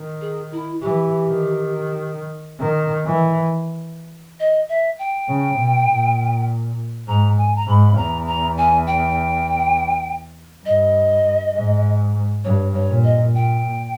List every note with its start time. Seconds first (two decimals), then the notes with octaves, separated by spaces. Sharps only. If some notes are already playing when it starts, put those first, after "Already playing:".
Already playing: D#3
0.21 G#4
0.52 E4
0.81 E3 G4
1.26 D#3
2.60 D#3
3.05 E3
4.40 D#5
4.69 E5
4.99 G5
5.28 C#3
5.59 B2
5.89 A#2
7.07 G#2 A#5
7.38 G#5
7.56 A#5
7.67 G#2 B5
7.97 E2 A#5
8.26 A#5
8.57 G#5
8.87 G5
10.65 G2 D#5
11.55 G#2
12.44 G2 C#5
12.74 C#5
12.89 A#2
13.04 D#5
13.34 A#2 G5